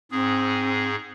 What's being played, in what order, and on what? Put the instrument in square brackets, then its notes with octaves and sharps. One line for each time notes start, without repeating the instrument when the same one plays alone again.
[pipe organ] G#2 G#4 [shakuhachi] C4